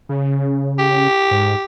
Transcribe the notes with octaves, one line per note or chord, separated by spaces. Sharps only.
C#3
G4
G#2